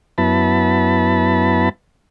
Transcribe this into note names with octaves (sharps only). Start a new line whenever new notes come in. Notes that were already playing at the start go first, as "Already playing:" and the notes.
F#2 B3 E4 A5 B5